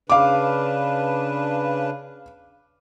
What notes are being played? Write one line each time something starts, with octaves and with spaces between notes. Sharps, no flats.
C#3 D4 B4 F5 D6